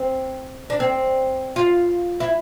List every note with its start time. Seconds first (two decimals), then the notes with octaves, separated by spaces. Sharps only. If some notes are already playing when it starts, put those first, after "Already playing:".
Already playing: C4
0.70 D4
0.80 C4
1.56 F4
2.20 E4